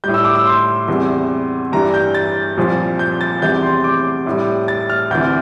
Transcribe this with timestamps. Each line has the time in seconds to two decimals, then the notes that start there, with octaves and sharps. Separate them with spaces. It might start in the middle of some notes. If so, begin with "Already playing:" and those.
0.04 A2 G3 G6
0.14 E6
0.24 D6
0.35 E6
0.46 C6
0.88 E2 C3 G3
1.72 G2 E3 G3 A#5
1.94 G6
2.15 A6
2.57 C2 A#2 F3
2.99 G6
3.21 A6
3.42 E2 C3 E3 G3 G6
3.62 C6
3.84 D6
4.26 A2 G3
4.68 A6
4.90 F6
5.11 D2 C3 E3 G6